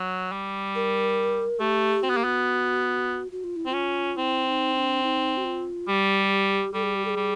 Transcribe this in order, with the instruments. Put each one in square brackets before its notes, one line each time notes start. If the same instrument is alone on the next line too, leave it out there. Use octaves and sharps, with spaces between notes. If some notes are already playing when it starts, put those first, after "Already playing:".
Already playing: [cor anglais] F#3
G3
[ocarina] A#4
[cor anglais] A3 [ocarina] G4
[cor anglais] C4 [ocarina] F#4
[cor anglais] B3
[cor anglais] A#3 [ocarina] G4
[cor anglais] B3 [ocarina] F#4
[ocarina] F#4
F4
E4
[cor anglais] C4
[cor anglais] C#4 [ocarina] F4
[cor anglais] C4 [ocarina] E4
[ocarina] E4
D#4
D#4
D4
D#4
F#4
F4
[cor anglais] G3 [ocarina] G4
[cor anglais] G3 [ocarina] A4
[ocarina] G#4
G4
A4
G#4
[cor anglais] G3